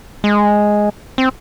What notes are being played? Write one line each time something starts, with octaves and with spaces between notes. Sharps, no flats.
G#3
C4